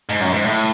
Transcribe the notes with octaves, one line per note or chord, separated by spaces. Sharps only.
G#2
F#2
G#2
A2